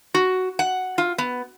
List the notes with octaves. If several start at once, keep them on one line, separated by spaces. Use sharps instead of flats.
F#4
F#5
F4
B3